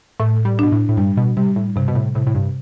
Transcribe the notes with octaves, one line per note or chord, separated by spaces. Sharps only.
A2 A3
G3
B2 D4
A2
A2
G2 G3
B2
C3 G3
A2
G2 C3
B2
A2
A2 C3
A2
G2